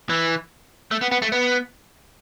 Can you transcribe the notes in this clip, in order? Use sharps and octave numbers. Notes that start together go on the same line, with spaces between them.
E3
A3
B3
B3
A3
B3